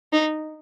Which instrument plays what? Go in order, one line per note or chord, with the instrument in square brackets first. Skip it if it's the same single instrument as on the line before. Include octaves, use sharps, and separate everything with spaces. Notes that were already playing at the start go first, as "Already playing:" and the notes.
[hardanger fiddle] D#4